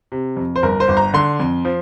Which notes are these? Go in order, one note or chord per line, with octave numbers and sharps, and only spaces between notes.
C3
F2
C5
G1 A#4
C5
G1
A#5
D3 C6
F2
F3